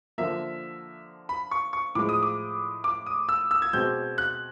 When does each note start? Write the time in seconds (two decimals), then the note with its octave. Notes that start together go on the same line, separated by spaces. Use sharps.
0.18 D3 F3 A#3 E5
1.29 B5
1.51 C#6
1.73 C#6
1.95 A2 F3 G#3 D6
2.09 D#6
2.23 D6
2.84 D6
3.06 D#6
3.29 E6
3.51 E6
3.62 G#6
3.73 B2 G#3 C4 G6
4.18 F#6